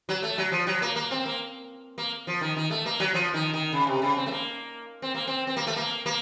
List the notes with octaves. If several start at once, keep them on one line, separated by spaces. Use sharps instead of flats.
F#3
A3
F#3
F3
F#3
A#3
A#3
C4
A#3
A#3
F3
D#3
D#3
A3
A#3
F#3
F3
D#3
D#3
C#3
C3
C#3
C4
A3
A#3
C4
A#3
C4
C4
A#3
A3
A#3
A#3